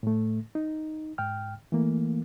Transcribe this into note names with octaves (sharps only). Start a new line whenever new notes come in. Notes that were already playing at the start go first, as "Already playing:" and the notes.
A2 A3
D#4
G#2 G5 F6
E3 A3 A#3